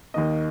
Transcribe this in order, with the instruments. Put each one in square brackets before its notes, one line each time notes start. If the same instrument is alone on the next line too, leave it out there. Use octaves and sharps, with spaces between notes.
[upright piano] D#2 D#3 A#3 D#5